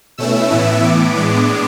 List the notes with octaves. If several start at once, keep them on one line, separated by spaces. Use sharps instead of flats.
B2 A3 C#4 E4 E6
A2 E3 B3 E4
A2 E3 B3 D6
A2 G#3 B3 D4